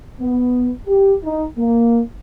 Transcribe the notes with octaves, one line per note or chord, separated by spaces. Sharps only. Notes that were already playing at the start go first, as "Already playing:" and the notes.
B3
G4
D#4
A#3